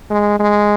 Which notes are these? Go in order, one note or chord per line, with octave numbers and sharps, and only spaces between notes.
G#3
G#3